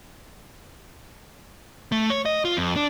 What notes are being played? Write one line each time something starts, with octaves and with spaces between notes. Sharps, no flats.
A3
C#5
D#5
F4
F2
D4